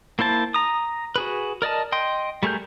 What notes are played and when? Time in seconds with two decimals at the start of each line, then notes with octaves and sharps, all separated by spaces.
0.19 A#3 E4 C5 A5
0.54 A#5 D#6
1.16 F#4 G#4 B4
1.62 A#4 D5 D#5 A5
1.92 D#5 G5 C6
2.43 G3 A3 G#4 A#4 G6